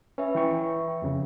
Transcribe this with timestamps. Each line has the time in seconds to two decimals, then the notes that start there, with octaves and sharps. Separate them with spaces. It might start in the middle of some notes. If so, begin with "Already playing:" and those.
0.18 C#4 B4 E5
0.35 E3 G5 C#6
1.02 F2 C#3